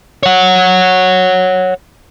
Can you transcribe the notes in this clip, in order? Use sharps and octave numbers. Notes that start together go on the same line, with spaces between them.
C#5 F#5